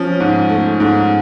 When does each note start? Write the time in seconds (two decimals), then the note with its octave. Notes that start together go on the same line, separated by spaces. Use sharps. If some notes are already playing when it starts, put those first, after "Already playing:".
Already playing: F3 C#4
0.20 G#2
0.50 A3
0.80 G#2